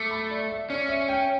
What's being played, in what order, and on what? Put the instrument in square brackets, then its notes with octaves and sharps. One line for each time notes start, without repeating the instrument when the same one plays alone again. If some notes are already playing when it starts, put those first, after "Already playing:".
Already playing: [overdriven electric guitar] A3 [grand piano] D6 E6
[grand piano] B5
D5
E5
[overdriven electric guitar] C#4 [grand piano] D5
[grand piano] E5
G5